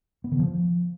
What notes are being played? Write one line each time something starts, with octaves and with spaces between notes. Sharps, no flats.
B3
D3
F3